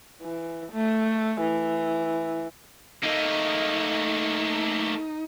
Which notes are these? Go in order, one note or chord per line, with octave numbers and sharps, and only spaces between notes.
E3
A3
E3
A3 A#3 D#4